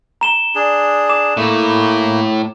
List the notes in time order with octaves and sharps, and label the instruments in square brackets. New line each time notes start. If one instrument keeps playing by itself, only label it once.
[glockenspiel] A#5 E7 G7
[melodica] D4 G#4
[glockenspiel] D6 E7
[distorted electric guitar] A2 [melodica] A3 A#3